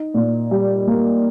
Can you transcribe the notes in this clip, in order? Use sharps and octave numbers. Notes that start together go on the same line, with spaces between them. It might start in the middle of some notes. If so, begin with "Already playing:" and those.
Already playing: D#4
A#2
G3
A#3